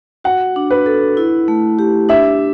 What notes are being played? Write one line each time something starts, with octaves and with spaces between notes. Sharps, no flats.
F#4 F#5
D4
B4
A4
E4
A3
G4
D4 E5